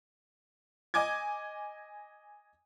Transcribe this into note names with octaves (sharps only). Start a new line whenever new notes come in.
D#5 G#5 D6 G#6